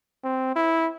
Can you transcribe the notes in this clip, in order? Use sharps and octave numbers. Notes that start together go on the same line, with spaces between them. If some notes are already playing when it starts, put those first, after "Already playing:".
C4
E4